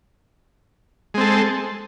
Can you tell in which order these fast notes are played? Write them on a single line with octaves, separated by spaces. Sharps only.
G#3 C4 A4